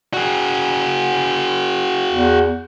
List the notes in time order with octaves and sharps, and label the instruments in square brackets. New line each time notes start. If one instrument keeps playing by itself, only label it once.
[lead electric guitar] F#4 G#4
[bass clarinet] E2